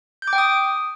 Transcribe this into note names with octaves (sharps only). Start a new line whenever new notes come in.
G6
D6
G5
D#6